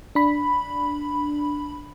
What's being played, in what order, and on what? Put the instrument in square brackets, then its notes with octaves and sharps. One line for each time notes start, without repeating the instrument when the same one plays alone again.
[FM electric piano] D4 B5